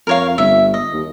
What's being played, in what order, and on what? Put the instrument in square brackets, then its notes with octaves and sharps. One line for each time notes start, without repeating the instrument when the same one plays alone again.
[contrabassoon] F2 [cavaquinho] A#4 C#5 F5
[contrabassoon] G1 [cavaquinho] E5
[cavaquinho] D#5
[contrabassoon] D#2